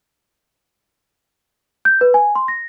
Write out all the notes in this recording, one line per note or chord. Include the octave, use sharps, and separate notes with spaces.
G6
B4
G#5
C6
A#6